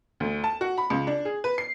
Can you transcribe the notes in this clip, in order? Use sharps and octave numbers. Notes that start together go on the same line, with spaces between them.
D2
A5
F#4
B5
C#2
D4
G#4
B4
C7